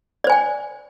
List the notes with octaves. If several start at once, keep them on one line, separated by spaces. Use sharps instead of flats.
C5 D5 G5 G#5